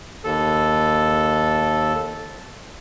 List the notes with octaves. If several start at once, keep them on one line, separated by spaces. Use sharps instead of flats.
D#2 A4